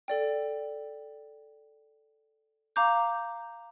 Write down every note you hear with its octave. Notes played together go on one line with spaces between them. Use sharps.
A4 D5 G5
F5 A#5 D6 G6